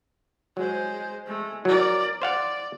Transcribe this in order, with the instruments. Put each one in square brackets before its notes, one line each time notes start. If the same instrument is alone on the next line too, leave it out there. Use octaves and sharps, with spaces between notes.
[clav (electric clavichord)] F#3 [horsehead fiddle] G#3 C5
[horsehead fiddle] G#3 A3
[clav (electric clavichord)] F#3 [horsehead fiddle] A#4 D5
[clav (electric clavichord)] C5 F5 F#5 [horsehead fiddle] D5